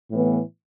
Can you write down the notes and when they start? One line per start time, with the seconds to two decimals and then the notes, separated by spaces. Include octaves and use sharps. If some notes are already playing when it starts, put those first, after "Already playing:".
0.11 A2 E3 B3